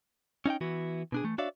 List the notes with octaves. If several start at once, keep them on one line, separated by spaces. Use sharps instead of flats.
C#4 D#4 E5 G5
E3 B3 E4 F#4
B2 D4 G#4
E3 A3
D4 F#4 C#5 D5 E5 F5